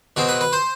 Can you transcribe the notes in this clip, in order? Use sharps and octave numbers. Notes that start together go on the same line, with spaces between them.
B2 G#3 C4
B4
B4
C5